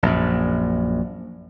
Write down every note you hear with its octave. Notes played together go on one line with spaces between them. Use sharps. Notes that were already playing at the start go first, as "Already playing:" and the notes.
A#1 F#2